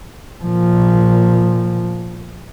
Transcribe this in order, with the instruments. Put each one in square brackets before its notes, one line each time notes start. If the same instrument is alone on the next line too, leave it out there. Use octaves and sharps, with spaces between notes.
[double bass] A#2 F3